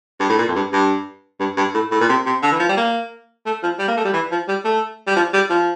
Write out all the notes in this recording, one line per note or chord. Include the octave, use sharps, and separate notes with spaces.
G2
A2
A#2
F2
G2
G2
G2
G2
A2
A2
A#2
C3
C3
D3
E3
F3
G3
A#3
A3
F3
G3
A#3
A3
G3
E3
F3
G3
A3
G3
F3
G3
F3